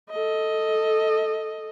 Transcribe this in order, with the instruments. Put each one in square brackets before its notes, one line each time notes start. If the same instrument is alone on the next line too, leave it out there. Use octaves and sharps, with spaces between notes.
[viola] A4 D#5